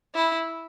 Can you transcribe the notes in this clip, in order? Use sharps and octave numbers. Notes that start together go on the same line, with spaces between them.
E4